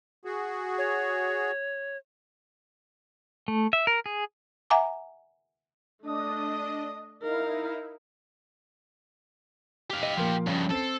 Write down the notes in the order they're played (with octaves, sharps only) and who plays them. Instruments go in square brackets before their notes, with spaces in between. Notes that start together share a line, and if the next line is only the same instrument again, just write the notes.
[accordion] F#4 G#4
[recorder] C#5
[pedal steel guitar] A3
E5
A#4
G#4
[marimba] E5 F#5 G#5 A#5 D6
[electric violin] A3 D#6 [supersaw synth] D4 D#5
[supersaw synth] D#4 E4 [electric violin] A#4 F5
[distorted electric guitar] G4 F5
[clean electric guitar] D#5
[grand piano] A#2 A#4 C6 [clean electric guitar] F3
[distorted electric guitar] G2 C#3 [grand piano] C#4
[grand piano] C4 C7 [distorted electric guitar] A4